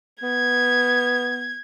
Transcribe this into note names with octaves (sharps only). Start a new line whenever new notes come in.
B3 G#6